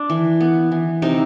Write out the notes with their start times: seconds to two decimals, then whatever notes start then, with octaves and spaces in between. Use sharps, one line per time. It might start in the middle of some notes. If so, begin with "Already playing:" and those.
Already playing: D4
0.10 E3
0.41 B3
0.71 E3
1.02 C3 D#4